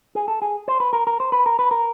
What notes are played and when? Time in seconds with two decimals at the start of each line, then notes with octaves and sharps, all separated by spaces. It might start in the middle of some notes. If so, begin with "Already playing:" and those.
0.15 G#4
0.28 A4
0.42 G#4
0.68 C5
0.80 B4
0.93 A#4
1.07 A#4
1.20 C5
1.32 B4
1.46 A#4
1.59 B4
1.71 A#4